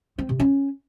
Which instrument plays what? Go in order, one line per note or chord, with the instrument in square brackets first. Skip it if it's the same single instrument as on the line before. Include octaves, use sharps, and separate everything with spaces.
[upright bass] C4
C3
C#4